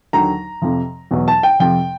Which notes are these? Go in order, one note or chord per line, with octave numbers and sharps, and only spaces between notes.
D#2 D3 F#3 A#5
F2 C3 F3
E2 B2 F#3
A5
G5
F2 C3 F3 G5